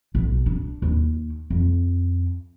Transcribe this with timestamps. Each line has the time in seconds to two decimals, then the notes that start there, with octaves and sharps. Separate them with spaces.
0.15 B1
0.46 D4
0.82 D#2
1.50 F2